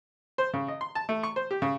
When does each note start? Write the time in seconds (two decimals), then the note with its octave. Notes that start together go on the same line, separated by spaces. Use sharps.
0.38 C5
0.54 C#3
0.68 D#5
0.81 C6
0.95 A5
1.09 A3
1.23 C#6
1.36 C5
1.51 G4
1.62 C#3